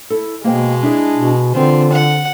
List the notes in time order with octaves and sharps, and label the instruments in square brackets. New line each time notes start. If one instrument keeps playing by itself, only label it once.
[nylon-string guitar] E4 A4
[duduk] B2 [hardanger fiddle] G#3 [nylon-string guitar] A#3 C5 G5
[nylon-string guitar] D4 E4 G#4
[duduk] B2
[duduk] D3 [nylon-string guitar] E3 F4 [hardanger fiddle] C4
[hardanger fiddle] F#5